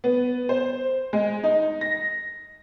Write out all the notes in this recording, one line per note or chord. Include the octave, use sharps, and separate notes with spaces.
B3
C5
G#3
D#4
A#6